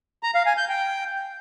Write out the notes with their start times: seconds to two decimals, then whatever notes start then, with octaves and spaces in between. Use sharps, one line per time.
0.23 A#5
0.35 F5
0.46 G#5
0.57 G6
0.69 G5